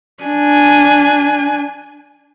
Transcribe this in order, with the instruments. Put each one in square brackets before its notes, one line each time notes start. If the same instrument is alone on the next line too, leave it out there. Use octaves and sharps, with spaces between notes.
[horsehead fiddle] D4 G#5